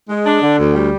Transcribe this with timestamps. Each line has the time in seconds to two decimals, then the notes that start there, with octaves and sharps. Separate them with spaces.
0.09 G#3
0.26 D4
0.43 D3
0.59 D2
0.75 G3